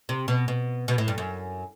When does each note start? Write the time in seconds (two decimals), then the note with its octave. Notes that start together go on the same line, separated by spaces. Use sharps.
0.09 C3
0.28 B2
0.48 B2
0.88 B2
0.98 A2
1.08 G2
1.18 F#2